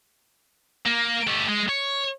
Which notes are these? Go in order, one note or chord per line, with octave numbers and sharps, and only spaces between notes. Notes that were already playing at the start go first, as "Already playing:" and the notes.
A#3
A3 G4
G#3
C#5